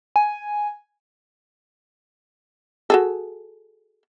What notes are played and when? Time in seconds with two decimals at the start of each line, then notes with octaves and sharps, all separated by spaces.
0.16 G#5
2.90 F#4 G#4 A4